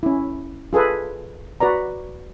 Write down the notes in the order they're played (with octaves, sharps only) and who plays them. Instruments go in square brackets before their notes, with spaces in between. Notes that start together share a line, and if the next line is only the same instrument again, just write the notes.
[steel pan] C#4 E4
F4 G#4 A4 B4
F#4 B4 D5 A#5